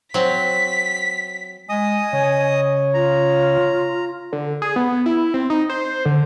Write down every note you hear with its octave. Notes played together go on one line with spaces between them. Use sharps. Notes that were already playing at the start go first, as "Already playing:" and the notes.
F#3 C4 B6
G#3 D#5 G#5 D#6
C#3 C#5
F4 A#5
D3
G#4
B3
E4
C4
D#4
C5
D3